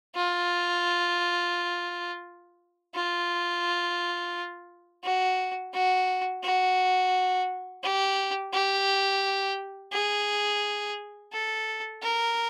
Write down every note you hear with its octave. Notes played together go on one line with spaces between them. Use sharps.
F4
F4
F#4
F#4
F#4
G4
G4
G#4
A4
A#4